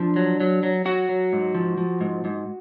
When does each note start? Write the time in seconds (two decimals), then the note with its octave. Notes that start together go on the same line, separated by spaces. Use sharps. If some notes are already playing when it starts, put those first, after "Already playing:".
Already playing: F3 D4
0.16 F#3
0.40 F#3
0.63 F#3
0.85 F#3 F#4
1.09 F#3
1.33 G#2
1.55 F3
1.78 F3
2.01 G#2
2.25 G#2